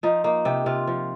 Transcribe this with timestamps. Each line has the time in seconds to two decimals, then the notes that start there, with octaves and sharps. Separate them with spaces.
0.03 F3 D#4
0.24 A#3 D#4
0.45 C3 G4
0.66 C3 F4
0.87 F3